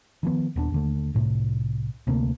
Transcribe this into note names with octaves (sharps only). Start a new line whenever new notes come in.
D#3 F3 B3
D#1 B3 D4
D#2 D3 A3
C2 A2 C3
D2 C3 A3 A#3